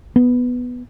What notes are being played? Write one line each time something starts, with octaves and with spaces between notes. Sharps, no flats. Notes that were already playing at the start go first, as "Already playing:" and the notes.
B3